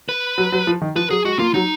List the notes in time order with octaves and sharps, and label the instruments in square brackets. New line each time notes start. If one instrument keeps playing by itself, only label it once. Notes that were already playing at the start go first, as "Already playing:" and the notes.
[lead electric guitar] B4
[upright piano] F#3
F#3
F3
D#3
[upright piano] F3 [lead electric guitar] B4
[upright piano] F#3 [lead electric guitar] G#4
[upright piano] G#3 [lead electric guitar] F#4
[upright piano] A#3 [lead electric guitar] F4
[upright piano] F#3 [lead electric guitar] D#4